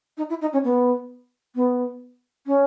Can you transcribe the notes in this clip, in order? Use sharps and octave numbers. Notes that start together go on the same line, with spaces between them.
D#4
E4
D#4
C#4
B3
B3
C#4